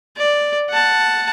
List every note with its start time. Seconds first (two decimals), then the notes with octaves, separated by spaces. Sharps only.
0.17 D5
0.70 F#5 A5